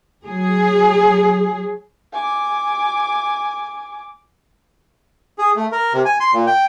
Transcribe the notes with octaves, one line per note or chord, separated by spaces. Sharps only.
F#3 G#4
G#5 D6
G#4
A3
A#4
C3
G#5
C6
A#2
G5